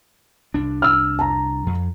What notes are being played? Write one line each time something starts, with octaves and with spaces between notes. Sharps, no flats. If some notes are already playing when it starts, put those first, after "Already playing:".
C2 D4
E6 F6
A5 A#5
F2